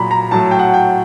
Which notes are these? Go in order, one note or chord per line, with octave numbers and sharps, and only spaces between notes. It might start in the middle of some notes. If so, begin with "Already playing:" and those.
Already playing: A#2 F#3 A#5 B5
A#5
A2 F#3 A5
G5
F#5
G5